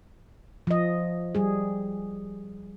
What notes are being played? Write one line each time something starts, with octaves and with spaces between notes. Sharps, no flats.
F3 D#5
G3 G#4